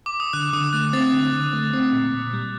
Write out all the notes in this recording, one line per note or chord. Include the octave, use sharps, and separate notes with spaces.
D6
D#6
D3 F#6
D3 D#6
A3 F#6
C4 A6
D3
D3
A3
C4
A#2
A#2
G3